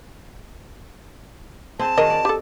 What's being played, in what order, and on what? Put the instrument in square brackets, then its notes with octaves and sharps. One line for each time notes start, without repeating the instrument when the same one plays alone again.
[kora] C4 G#4 [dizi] A5
[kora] D#3 F#4 G#4 [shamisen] A#4 D#5
[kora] D5
[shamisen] G4 A4